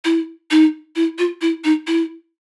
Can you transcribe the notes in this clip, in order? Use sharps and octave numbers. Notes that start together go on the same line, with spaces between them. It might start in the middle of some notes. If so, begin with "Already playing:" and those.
E4
D#4
E4
F4
E4
D#4
E4